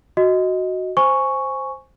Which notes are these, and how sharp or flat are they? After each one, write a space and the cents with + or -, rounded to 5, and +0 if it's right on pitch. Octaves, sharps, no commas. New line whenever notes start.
F#4 +0 D#5 +10
C5 +0 G#5 +0 C#6 +0